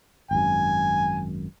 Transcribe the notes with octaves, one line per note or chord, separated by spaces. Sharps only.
G#1 F#2 G#5